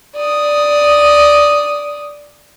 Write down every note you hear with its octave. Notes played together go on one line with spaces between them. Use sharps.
D5 D#6